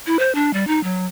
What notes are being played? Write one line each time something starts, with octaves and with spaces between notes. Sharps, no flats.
E4
C5
D4
G3
D#4
F#3